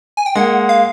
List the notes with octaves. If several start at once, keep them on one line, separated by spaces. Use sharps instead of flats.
G#5
G5
G#3 A#3 F#5
F5